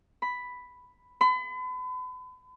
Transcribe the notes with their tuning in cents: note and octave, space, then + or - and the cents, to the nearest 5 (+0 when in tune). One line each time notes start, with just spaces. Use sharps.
B5 +5
B5 +40